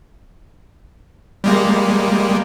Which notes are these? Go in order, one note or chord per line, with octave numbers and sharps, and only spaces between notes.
G3 G#3 A#3